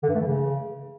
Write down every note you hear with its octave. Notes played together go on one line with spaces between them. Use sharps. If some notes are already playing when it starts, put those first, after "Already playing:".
D3
G2
A3
E3
C#3